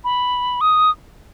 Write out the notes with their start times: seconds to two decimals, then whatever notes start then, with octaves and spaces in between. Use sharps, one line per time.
0.04 B5
0.61 D#6